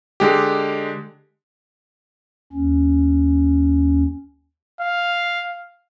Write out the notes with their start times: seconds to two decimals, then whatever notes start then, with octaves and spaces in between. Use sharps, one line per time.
0.20 D3 G#3 G4
2.53 D#2 C#4
4.81 F5